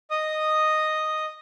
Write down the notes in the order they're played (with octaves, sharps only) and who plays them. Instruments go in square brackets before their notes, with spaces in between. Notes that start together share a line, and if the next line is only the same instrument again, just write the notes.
[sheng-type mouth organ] D#5 D#6